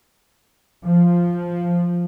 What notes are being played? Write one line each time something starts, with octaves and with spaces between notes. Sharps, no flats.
F3